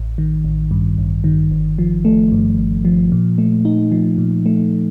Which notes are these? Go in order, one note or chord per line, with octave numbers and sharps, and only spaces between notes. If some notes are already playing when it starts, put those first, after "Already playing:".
Already playing: A1
D#3
A1
G2
A1
D#3
G1
F3
A3
G2
G1
F3
A#2
A3
D#4
F3
A#2
A3